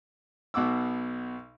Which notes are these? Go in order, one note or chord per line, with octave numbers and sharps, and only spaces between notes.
B1 B2 F#5 D6 E6